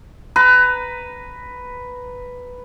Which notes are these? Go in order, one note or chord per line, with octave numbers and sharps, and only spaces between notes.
B4 A#5